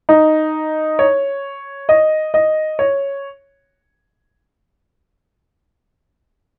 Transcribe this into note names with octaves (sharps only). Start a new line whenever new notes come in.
D#4
C#5
D#5
D#5
C#5